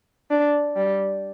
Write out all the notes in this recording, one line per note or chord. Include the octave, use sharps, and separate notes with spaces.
D4
G3